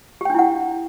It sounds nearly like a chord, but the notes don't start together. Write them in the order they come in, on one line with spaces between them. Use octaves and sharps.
G4 G5 D4 E4 F#5